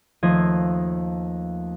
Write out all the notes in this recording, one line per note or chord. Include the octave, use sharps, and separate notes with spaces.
D#2 F3 A3 D#5 G#6